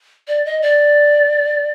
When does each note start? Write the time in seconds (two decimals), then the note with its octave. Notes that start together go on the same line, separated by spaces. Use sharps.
0.28 D5
0.45 D#5
0.62 D5